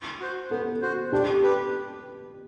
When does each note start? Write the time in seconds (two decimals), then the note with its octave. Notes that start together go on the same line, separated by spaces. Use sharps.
0.20 F#4 C5
0.51 B3 A4
0.82 F#4 C5
1.12 D4 G4
1.42 G4 B4